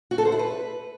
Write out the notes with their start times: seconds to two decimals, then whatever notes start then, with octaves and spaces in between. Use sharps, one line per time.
0.11 F#4
0.18 A4
0.25 C5
0.32 E4
0.39 B4